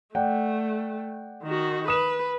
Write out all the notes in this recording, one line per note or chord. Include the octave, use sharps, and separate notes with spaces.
A3 D5 F#5 G5
D#3 F#4
B4 D#6 E7